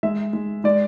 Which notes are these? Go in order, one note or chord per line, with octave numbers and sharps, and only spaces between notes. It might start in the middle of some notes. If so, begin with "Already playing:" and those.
G#3 E5
G#3
G#3 D5